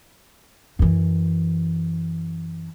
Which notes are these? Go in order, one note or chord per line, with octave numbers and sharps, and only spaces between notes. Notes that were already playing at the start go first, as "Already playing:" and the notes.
F#2 E3